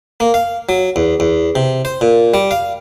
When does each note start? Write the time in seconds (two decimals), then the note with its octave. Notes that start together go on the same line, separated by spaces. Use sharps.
0.20 A#3
0.34 F5
0.69 F#3
0.96 E2
1.20 E2
1.55 C3
1.85 C5
2.01 A#2
2.34 G3
2.51 F5